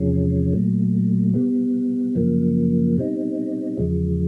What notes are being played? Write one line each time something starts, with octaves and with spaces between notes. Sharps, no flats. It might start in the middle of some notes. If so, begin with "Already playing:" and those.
Already playing: E2 C3 F3 G#3 C#4
A#2 F#3 A3
B2 G3 B3
F#2 C#3 F3 A#3
B2 G3 C4 D#4
E2 C#3 F3 G#3